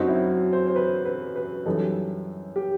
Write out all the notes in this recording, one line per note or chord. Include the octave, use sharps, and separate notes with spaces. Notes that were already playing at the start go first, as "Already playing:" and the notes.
Already playing: F#2 F#3 C4 D#4 F#4
E4
C5
C5
B4
B4
B4
F#2 E3 G3 D#4 A4
G4